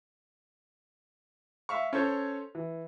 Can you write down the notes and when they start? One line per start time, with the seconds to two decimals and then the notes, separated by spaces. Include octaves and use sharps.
1.69 E5 F5 C#6
1.93 C#4 A4 C5 C#5
2.55 E3